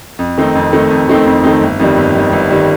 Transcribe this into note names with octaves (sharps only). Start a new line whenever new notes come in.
F2
D#3 A3 C4 D#4
F2
D#3 A3 C4 D#4
F2
D#3 A3 C4 D#4
F2
D#3 A3 C4 D#4
G1
F2 D#3 G3
G1
F2 D#3 G3
G1
D#3 G3